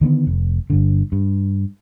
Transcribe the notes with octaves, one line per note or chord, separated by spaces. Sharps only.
D3 D#3 A3 B3
F1
G1 G2 D3
G2